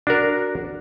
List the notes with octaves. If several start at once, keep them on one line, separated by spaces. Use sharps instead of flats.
D4 F#4 A#4